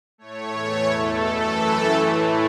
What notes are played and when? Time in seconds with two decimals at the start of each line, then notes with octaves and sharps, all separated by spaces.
0.18 A2 A3 C#5
0.53 E2 E3 A3
0.87 E2 B2 A3 A4
1.22 F#2 E3 A3 A4
1.57 F#2 E3 A3
1.91 A2 E3 A3